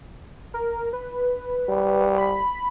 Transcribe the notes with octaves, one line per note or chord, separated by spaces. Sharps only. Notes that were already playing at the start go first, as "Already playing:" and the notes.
A#4
B4
G3
B5